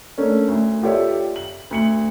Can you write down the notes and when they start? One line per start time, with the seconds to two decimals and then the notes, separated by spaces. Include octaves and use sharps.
0.18 A3 A#3 C#4 D4 C#5
0.48 D2
0.83 F4 G4 A4 C#5 D5 E5
1.36 F#7
1.71 D2 C#7 F#7